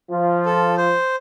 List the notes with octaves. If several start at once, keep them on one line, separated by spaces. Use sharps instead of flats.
F3 F4
A4
C5